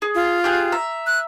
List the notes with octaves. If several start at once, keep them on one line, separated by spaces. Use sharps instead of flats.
G#4
F4
G4 G#4 F#6
E5 A#5
F#6